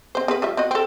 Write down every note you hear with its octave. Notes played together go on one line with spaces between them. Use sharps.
C4 C5
C4 G#4 B4
G3 F4 E5
C4 F#4 D#5
C4 A4